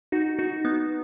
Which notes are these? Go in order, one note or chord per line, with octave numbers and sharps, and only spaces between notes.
D#4 F#4
D#4 F#4
B3 D#4